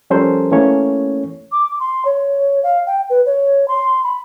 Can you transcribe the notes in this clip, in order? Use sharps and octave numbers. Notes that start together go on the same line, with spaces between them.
F3 G3 C#4 A4 A#4 C5
E3 A3 A#3 C#4 C#5
D6
C6
C#5
F5
G5
B4
C#5
C6
B5